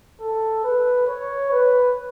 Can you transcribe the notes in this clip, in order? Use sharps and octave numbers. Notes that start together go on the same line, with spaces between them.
A4
B4
C#5
B4